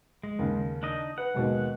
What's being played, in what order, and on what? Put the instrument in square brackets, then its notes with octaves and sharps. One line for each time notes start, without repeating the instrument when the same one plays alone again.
[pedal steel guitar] G#3
[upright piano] D#2 C#3
[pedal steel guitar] D4 D#4 D#5
[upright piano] B4 [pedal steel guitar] F#5
[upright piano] D#2 B2 G#3